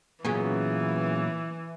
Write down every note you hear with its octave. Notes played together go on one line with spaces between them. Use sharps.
A#2 C#3 E3 F#3 B3 C#4